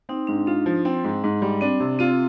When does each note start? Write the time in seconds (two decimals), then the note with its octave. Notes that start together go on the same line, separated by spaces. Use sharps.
0.09 C4 D#4
0.27 G#2 D4
0.47 D4 F4
0.66 F3
0.85 C4
1.04 G#2
1.24 G#2
1.42 G3
1.61 C4 D4
1.80 C3
1.99 C4 F4